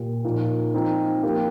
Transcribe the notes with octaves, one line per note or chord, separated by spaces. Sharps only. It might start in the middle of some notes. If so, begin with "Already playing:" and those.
Already playing: A#2 A#3 G4
A#2 F3 A#3 D#4
F3 C4 D#4
F3 A#3 G4